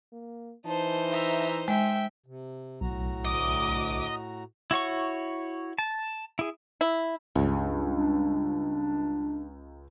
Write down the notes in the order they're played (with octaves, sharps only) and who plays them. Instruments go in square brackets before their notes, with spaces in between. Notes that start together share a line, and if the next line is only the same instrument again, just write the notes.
[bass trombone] A#3
[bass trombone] E3 [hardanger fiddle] D#4 C5 [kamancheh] A5
[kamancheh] E5 A#5
[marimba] G#3 [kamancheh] E5 G5
[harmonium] C3
[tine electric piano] B1 [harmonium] A2 F#4 A#5
[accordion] D2 D6 D#6 [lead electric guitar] D#5
[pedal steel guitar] E4 F#4 C#5 C#6
A5
E4 G#4
[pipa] E4
[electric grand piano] C#2 [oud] G2 C#3
[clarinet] D4